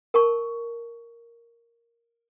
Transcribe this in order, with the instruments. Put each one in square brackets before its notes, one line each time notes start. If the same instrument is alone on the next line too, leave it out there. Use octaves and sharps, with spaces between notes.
[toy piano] A#4 A5 C#6